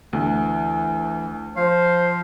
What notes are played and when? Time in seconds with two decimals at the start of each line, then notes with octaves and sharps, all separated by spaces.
0.13 D2 E3
1.56 F3 C5 F5